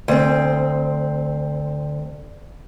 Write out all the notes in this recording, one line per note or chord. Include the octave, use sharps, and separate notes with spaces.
D2 C4